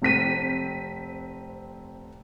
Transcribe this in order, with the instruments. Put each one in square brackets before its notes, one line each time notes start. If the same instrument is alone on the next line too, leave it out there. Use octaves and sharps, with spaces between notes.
[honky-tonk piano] F1 C4 B6 D#7